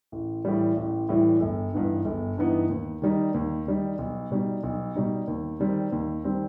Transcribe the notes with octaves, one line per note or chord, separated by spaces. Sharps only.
A1
A2 E3 G3
A1
A2 E3 G3
G1
G2 E3 B3 D#4
G1
G2 E3 B3 D#4
D#2
D#3 G3 D#4
D#2
D#3 G3 D#4
B1
B2 G3 D#4
B1
B2 G3 D#4
D#2
D#3 G3 C4
D#2
D#3 G3 C4